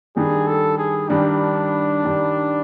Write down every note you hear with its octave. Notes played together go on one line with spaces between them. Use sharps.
G2 D#3 G3 G#4
A4
G#4
G2 D#3 G3 D4
G2 D#3 G3